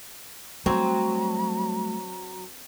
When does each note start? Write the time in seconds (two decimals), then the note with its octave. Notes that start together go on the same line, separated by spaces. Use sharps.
0.66 F#3 G3 A3 C4 A#5